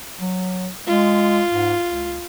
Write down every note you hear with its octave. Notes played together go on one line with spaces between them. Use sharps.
F#3
G#3 F4
G#2
C#2